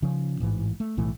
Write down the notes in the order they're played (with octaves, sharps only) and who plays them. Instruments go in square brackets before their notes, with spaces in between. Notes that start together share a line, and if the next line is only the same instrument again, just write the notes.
[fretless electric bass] C#3 F3 C#4
A1 G#2 E3
A3
B1 A2 E3 A3